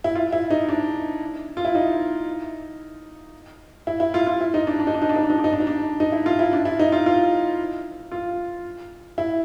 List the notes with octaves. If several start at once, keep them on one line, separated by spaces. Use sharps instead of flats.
E4
F4
E4
D#4
D4
F4
E4
D#4
E4
E4
F4
F4
E4
D#4
D4
D4
D#4
D4
D#4
D4
D#4
D4
D#4
D4
D#4
D4
D#4
D4
D#4
E4
F4
E4
D4
E4
D#4
F4
F4
F4
E4